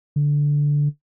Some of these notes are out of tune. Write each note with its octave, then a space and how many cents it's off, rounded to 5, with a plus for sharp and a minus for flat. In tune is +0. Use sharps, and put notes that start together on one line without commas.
D3 -10